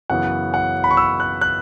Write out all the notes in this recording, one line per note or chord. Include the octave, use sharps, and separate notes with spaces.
F#2 C#3 E3 B3 F#5
F#5
B5
C#6
E6
F#6
F#6